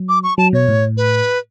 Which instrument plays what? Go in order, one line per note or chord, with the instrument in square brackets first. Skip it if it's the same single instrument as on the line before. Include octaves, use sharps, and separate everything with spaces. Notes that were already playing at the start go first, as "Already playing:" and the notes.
Already playing: [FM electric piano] F#3
[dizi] D6
C#6
[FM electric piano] F#3 [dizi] A5
[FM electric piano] B2 [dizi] C#5
[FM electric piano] A2
[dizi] B4